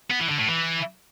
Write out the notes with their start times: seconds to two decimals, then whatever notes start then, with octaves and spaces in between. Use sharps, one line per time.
0.10 B3
0.20 E3
0.29 D3
0.39 A2
0.48 E3